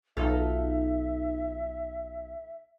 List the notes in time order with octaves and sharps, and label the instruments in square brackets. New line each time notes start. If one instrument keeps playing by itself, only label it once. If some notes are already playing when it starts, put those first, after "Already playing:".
[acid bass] B1 [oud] D#4 F4 A4 [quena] E5